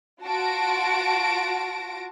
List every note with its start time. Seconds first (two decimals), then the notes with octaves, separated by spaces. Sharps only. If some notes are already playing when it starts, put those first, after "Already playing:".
0.22 F4 F#4 A5 A#6 D7